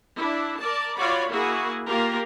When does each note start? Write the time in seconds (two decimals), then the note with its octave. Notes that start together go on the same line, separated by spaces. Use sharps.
0.17 D4 E4
0.59 A#4 D5 A5
0.97 F4 F#4 C#5 D5 B5
1.30 A#3 E4 F#4 G#4
1.88 A#3 F4 G4 A#4